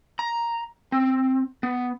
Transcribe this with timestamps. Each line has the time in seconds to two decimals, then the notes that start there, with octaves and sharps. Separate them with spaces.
0.19 A#5
0.92 C4
1.63 B3